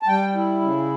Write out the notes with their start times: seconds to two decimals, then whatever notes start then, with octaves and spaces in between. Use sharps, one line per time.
0.03 A5
0.07 G3 G5
0.35 E4
0.62 C#3